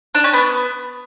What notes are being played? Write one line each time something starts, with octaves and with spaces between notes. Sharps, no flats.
D4
C#4
B3